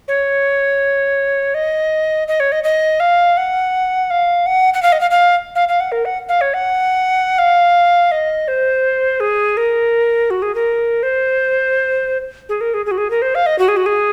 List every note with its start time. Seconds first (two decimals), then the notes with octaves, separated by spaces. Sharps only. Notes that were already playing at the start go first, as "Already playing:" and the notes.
0.08 C#5
1.54 D#5
2.28 D#5
2.40 C#5
2.52 D#5
2.64 D#5
3.00 F5
3.37 F#5
4.10 F5
4.46 F#5
4.74 F#5
4.83 F5
4.92 D#5
5.01 F5
5.11 F5
5.55 F5
5.69 F5
5.80 F#5
5.92 A#4
6.05 F#5
6.29 F5
6.41 C#5
6.54 F#5
7.38 F5
8.12 D#5
8.48 C5
9.20 G#4
9.57 A#4
10.30 F#4
10.42 G#4
10.55 A#4
11.03 C5
12.49 G#4
12.61 A#4
12.74 G#4
12.86 G#4
12.91 F#4
12.98 G#4
13.11 A#4
13.22 C5
13.35 F5
13.46 D#5
13.59 F#4
13.68 G#4
13.77 F#4
13.86 G#4